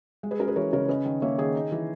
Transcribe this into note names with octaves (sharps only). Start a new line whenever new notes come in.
G#3
G#4 B4
C#4 F#4 A#4
G#4 B4
E3 A#4 C#5
C#3 A#4 C#5
C#4 B4 D#5
D#3
A#3 C#5 E5
D#3 G#4
D#4
E3